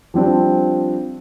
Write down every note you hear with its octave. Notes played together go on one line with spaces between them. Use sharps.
F3 G3 C4 D4